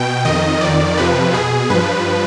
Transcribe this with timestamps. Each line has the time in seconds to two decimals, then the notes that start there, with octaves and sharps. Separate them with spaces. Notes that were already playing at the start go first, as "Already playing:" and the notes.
Already playing: B2 G5
0.25 F2 D#3 D#5
0.61 F2 D#3 D5
0.97 F2 C3 F3 B4
1.33 B2 G#4
1.70 G2 F3 B4